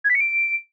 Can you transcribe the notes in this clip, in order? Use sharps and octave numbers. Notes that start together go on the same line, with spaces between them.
G#6
B6
C#7
D7